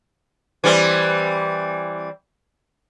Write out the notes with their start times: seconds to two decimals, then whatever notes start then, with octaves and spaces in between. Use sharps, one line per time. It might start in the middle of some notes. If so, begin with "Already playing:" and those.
0.64 E3 G3 C4